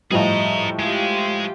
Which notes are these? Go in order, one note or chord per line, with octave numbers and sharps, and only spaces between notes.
A2 F3 G3 G#4 D#5 A#5
G#3 F4 G4